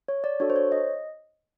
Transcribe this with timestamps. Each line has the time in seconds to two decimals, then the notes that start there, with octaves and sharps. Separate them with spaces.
0.08 C#5
0.24 D5
0.40 D4 F#4 A4 C#5
0.50 C5
0.56 C#5
0.72 D#5